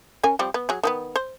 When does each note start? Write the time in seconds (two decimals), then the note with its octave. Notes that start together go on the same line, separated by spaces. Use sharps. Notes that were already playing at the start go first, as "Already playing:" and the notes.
0.23 C#4 A#4 G#5
0.39 F3 G3 C4
0.54 B3
0.69 F#3 G#4
0.83 D#3 F3 B3
1.16 C5